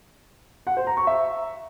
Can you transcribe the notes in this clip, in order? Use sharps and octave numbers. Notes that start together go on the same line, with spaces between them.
F#5
C5
A#5
C#6
E5